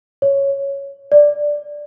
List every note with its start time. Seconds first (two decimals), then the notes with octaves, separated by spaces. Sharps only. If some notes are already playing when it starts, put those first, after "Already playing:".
0.22 C#5
1.12 D5